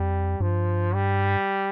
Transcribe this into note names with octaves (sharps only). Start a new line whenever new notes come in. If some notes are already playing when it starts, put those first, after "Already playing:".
Already playing: F2 G3
G2 F3
G3